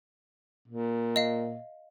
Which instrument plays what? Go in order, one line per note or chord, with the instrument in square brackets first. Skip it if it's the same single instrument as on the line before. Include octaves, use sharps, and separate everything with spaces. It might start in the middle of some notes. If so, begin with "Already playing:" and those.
[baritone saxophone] A#2
[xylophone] D#5 F5